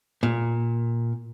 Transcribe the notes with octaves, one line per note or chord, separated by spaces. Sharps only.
A#2